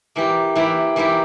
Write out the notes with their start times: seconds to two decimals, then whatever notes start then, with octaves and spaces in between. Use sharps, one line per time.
0.16 E3 A#3 E4 G4
0.55 E3 A#3 E4 G4
0.96 E3 A#3 E4 G4